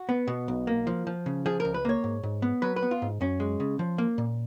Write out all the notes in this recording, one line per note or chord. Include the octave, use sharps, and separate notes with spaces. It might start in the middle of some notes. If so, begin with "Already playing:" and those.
Already playing: F#4
B3
B2
B1
A#3
F3
F3
C#3
F3 G#4
C#2 A#4
B4
A#3 C#5
G#2
G#2
B3
F#3 B4
B4
B3
F4
G#2
F#2 C#4
G#3
C#3
F3
A#3
A#2